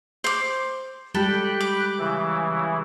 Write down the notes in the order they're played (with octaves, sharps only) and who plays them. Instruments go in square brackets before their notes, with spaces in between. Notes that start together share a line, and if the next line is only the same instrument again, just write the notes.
[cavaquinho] C5 D6
[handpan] G3 G#3 G4 [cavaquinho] A4 [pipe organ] G5 B5 F#6
[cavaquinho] D6
[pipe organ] C#3 E3 E4